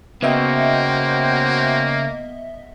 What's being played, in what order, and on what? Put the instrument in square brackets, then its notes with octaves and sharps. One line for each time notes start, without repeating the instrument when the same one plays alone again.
[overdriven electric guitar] C#3 [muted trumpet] A#3 [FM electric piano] B3 D#5 E5 [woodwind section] F#4 C5 G5